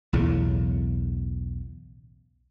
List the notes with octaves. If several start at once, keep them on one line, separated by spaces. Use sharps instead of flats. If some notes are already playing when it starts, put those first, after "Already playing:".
B1 E2 A2 C#3